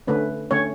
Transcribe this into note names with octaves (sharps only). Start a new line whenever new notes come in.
D3 A3 C#4 B4
D3 A3 C#4 C#5